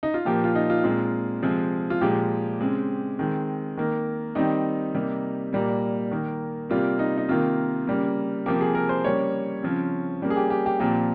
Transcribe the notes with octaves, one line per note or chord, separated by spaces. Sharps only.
D#4
F4
A#2 F3 A#3 G4
F4
D#4
F4
A#2 G#3 C4 F4
C3 F3 G#3 C4
F4
A#2 F3 G#3 G4
C#3 G#3 C4
D#3 G#3 C4
D#3 A#3
D#3 G3 C4 D#4
C3 G3 A#3
A#2 G3 A#3
D#3 A#3
C3 G3 A#3 F4
D#4
D#4
C3 D#3 A#3 F4
C#3 G3 A#3
C3 F3 A#3 G4
G#4
A#4
C5
C#3 G3 A#3 C#5
C#3 F3 C4
C#3 G3 A#3
G#4
G4
G4
G4
A#2 F3 C4 G4